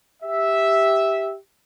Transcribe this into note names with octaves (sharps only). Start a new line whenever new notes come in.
G4 E5